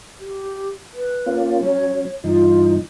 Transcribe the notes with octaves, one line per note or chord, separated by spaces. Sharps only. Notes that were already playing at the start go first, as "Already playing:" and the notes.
G4
B4
A#3 C#4 F4
F#3 C#4 C#5
G2 E3 D#4 F4